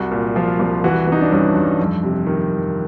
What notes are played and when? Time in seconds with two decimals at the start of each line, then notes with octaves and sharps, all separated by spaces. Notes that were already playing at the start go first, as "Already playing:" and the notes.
Already playing: C2 F#4
0.11 A#2
0.36 F3 F4
0.59 C2
0.84 E3 F#4
1.07 E3 D#4
1.21 D4
1.32 G2 C#4
1.55 G2
1.79 F2
2.03 C3
2.26 D#3
2.50 F2